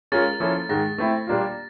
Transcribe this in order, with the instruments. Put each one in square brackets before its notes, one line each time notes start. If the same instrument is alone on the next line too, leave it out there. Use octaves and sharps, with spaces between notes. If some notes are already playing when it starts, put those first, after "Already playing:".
[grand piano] G#3 C#4 F4 A#4 [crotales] A6
[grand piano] F3 A#3 C#4 E4 A4
[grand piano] G#2 D#3 G#3 [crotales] A#6
[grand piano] A3 C4 E4
A#2 G3 A#3 D4 F4